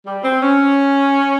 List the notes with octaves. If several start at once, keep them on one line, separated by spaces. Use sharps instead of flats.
G3
C4
C#4